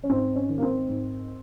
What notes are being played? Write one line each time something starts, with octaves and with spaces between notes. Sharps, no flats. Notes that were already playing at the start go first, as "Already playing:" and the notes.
C#4
G#2 C4
C#4
D#3
A#3
C4
G#2